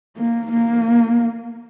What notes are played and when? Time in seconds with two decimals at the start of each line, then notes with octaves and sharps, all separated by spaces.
0.17 A#3
0.51 A#3